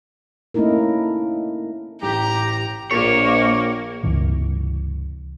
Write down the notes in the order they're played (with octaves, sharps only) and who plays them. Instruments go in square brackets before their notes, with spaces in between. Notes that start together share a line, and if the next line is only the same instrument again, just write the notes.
[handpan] A3 A#3 C#4 D#4 E4 A#4
[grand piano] A1 A2 [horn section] G4 [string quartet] A#5
[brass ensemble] A#1 [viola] A#3 [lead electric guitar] C#5
[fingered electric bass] C#2 G2 C3 E3